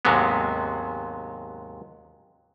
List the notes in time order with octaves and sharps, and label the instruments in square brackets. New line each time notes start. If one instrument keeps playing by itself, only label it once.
[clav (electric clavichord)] D#2 G#2 C3 F#3 G#3 B3